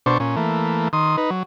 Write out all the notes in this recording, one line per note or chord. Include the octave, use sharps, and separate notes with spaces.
B2 D4 C5 C#6
A#2 C#4
E3 A3 A#3
D#3 C6 D#6
D#4 B4
F#3